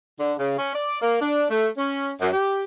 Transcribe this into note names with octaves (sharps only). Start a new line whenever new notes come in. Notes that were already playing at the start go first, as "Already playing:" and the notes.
D3
C#3
C#4
D5
A#3
D4
A3
C#4
F#2
G4